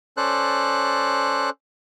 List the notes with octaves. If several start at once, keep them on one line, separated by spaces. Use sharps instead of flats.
C#4 A4 C5 D5 F#6